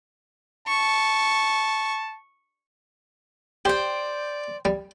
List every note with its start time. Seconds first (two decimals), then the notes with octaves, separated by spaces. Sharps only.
0.68 A5 C#6
3.65 G4 C5 D5 G5
4.65 G3